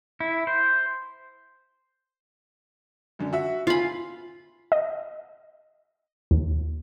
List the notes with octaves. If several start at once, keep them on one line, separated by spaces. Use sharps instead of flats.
E4
C5
F#2 D3
F#4 E5
F4 G#5 B5 C7
D#5
D#2